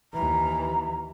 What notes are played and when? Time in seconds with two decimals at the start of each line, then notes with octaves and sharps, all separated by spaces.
0.14 D#2 E3 A#5